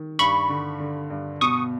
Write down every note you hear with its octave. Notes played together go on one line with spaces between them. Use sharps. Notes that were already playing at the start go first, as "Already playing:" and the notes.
Already playing: D#3
G2 B5 C#6
D3
D3
G2
B2 C#6 D#6